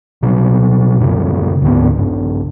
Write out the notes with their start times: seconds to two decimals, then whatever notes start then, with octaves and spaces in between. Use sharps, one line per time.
0.23 B2 F#3 G3
1.00 F#2 A#2 C#3 G3
1.62 D2 G#2 F#3 B3
1.98 A#1 G2